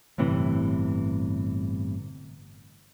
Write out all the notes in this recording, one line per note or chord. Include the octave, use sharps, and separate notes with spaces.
G1 A2 C3 E3